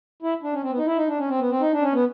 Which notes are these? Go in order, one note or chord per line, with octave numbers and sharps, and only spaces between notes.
E4
D4
C#4
C4
B3
D#4
E4
D#4
D4
C#4
C4
B3
C4
D#4
D4
C#4
B3